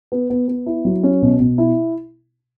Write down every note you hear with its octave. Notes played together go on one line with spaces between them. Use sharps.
B3
B3
B3
E4
F#3
C#4
B2
B2
E4